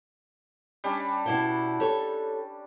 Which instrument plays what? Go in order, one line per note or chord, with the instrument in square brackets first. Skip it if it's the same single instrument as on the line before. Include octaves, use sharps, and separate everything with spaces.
[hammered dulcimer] G3 C#4 D4
[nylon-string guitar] B2 E4 G5
G4 A4 C#5